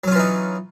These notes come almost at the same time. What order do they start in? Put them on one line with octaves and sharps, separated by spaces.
F#3 C#4 F4 E3 D#4